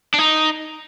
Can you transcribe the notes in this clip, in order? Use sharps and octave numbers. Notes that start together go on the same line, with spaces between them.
D4
D#4